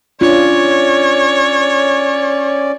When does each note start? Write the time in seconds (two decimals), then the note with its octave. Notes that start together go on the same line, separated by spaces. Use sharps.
0.21 C#4 D4 F4 C#5 D5